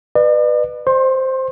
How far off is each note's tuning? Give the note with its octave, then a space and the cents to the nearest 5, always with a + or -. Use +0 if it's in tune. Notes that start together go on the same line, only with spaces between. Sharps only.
B4 +0 D5 +45
C5 +0 C6 +30